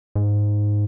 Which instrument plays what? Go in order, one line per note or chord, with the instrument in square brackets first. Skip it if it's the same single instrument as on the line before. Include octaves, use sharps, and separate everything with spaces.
[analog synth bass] G#2